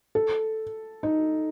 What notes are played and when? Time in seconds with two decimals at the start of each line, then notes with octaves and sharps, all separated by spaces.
0.15 A4
1.03 D#4